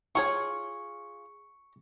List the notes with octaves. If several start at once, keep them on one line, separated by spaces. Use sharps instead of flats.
F4 G#4 C#5 C#6